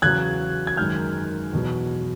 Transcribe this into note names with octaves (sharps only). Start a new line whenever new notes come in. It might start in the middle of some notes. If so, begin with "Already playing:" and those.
E2 C#3 F#3 F#6 G#6
G#6
F#2 D#3 G#3 F6 G6
E2 B2 F#3